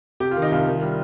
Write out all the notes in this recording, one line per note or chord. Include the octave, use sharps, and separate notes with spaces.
C3 G4
F4
D#3
D#4
C2 F4
D#3
G3